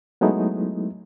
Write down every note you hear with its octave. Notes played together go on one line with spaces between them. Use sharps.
F#3 G#3 A3 B3 D#4 E4